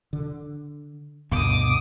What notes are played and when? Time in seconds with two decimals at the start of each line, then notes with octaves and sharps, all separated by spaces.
0.13 D3
1.32 D2 G2 B2 D6 D#6